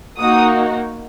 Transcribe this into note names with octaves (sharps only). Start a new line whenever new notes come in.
A#3 D#4 F#4 D#6